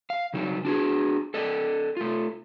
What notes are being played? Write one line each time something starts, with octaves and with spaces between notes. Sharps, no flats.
F5
C#3 F#3 D#4
D4 F#4 G#4
A4 D5 D#5
A3 F4